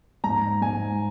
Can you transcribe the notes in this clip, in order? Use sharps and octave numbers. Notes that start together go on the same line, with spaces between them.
G#2 A#5
G#2 G#5